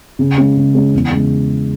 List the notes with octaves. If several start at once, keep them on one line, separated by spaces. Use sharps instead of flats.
C#3
G#3 C#4
C#3
G#3 C#4
E2
C#3 G#3